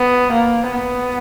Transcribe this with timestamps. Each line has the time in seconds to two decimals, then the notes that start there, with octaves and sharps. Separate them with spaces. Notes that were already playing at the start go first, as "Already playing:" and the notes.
Already playing: B3
0.32 A#3
0.72 B3